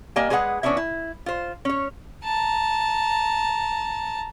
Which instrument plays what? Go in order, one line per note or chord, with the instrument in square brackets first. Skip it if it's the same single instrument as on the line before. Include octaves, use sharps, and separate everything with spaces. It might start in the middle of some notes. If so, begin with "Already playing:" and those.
[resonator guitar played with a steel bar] G3 A#3 D#5 G#5
G#3 G#4 B4 C#5 F#5
E3 B3 C#4 D4 E4 E5
E4
F4 C5
C#4 C#5
[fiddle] A5 A#5